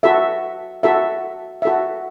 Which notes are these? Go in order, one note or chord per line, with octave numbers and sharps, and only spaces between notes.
F#4 A4 E5
F#4 A4 E5
F#4 A4 E5